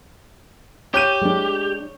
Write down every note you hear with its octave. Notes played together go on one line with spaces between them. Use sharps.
G4 C#5 G6 D#7
G#3 D4